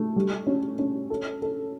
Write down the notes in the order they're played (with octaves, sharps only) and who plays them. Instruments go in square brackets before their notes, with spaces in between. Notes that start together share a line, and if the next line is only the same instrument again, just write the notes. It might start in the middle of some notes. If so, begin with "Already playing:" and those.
Already playing: [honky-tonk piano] A3
G3
C#4
C#4
A4
A4